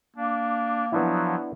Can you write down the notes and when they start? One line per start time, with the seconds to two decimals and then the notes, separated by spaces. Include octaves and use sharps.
0.16 A#3 D4
0.92 F3 F#3 B3 D4 E4